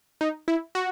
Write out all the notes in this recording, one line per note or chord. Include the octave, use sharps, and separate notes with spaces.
D#4
E4
F#4